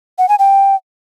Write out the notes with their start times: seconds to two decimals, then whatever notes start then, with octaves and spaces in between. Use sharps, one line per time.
0.18 F#5
0.29 G#5
0.39 G5